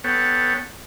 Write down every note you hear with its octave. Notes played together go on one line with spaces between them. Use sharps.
B3 A4 C#5 F#5 G5